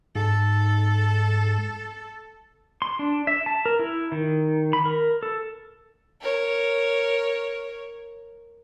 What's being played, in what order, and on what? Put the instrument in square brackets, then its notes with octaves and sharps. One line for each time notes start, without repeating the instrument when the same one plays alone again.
[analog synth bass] G#2 [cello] A4
[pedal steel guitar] C6
D4
E5
A5
A#4
E4
D#3
B5
A#4
A4
[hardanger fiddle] A#4 C#5